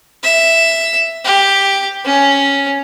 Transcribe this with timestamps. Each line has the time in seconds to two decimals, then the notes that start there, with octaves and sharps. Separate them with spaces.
0.23 E5
1.25 G4
2.05 C#4